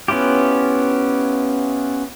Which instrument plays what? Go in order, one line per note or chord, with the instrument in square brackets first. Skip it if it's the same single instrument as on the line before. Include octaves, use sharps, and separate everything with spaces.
[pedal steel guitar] B3 C#4 E4 F4 G4